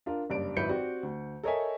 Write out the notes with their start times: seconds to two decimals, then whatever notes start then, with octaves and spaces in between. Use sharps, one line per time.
0.06 D4 F4 A#4
0.30 F#1 G2 D5 D7
0.56 G#1 F#3 E4 B4 G6 C#7
0.69 C4 F#4 G4 D5
1.03 D2
1.43 A4 A#4 C#5 D#5 E5 G#5